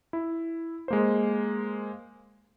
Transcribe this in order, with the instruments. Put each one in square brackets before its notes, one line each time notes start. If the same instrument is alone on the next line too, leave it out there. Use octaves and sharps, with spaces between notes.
[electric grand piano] E4
G#3 A#3 C5